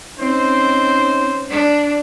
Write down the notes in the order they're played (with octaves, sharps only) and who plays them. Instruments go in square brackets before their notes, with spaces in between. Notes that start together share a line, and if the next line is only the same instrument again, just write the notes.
[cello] C4 [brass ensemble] C#4 D#4 C5
[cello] D4